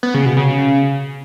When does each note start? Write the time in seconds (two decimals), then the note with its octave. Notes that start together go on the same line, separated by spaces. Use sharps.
0.03 B3
0.14 C#3
0.26 B2
0.37 C#3